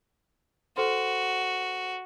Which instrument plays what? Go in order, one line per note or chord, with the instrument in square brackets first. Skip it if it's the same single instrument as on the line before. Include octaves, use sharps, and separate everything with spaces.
[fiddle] F#4 [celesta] A4 C5 C6